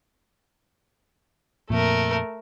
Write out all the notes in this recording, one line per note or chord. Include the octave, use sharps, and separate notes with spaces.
F2 A#2 A3 A#4